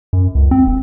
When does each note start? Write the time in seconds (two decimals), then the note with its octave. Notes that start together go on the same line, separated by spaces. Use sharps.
0.13 F#2
0.35 C#2
0.51 C4
0.67 E1